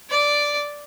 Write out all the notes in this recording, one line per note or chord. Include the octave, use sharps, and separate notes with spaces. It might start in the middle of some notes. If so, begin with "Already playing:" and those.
D5